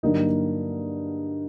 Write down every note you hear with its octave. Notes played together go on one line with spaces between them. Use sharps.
G2 D3 F#3 A#3 D#4